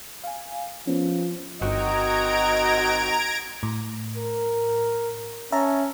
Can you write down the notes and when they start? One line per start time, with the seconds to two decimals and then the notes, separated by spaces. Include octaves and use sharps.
0.24 F5 G#5
0.87 F3 B3 C#4
1.62 G1 D#3 C4 F#4 D#5 A#5 G#6 D7
3.63 A2
4.17 A#4
5.52 C#4 E5 A5 A#5